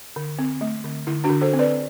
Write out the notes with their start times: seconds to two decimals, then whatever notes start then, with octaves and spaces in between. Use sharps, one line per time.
0.16 D3
0.39 C4
0.61 A3
0.84 D3
1.07 D3 E4
1.24 D4 F#4
1.30 D3
1.41 A4 C5
1.54 C4
1.59 B4 D5